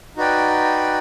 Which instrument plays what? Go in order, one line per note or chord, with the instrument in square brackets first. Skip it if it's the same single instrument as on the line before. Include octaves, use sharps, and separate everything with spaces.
[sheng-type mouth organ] D#4 F#4 B4 D5 G5